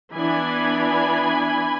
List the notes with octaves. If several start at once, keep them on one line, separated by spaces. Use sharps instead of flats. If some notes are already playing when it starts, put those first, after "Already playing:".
E3 B3 D4 G#5 B5